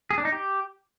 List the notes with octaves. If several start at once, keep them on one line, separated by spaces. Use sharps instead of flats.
G#4
D4
D#4
G4